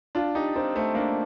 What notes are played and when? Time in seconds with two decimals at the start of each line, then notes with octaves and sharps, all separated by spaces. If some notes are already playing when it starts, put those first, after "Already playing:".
0.15 D4 F4
0.35 D#4 G4
0.56 C4 D#4
0.75 A3 C4
0.95 A#3 D4